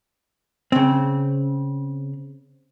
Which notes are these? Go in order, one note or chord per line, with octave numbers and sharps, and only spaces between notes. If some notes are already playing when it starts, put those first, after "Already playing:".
C#3 C4